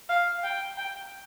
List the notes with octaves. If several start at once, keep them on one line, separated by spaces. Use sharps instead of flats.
F5
G5
G5